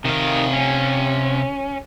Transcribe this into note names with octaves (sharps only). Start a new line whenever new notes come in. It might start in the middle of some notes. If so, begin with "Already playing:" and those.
C3 D#3 F5
C#4